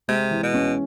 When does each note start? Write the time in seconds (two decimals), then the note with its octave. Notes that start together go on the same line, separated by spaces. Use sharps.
0.08 C3 G#3
0.31 E3
0.43 B2
0.54 C#4